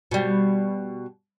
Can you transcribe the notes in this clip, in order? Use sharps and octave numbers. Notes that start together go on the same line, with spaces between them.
B2 G3